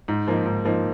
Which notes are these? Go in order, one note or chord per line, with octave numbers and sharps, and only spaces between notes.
G#2
F3 A#3 D#4
G#2
F3 A#3 D#4